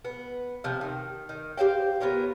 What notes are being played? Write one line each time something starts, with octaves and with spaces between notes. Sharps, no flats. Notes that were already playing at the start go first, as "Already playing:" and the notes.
B3
C3 F3
D#3
D#3
G4 C5 F5 G5
B3 F4 A#4 C#5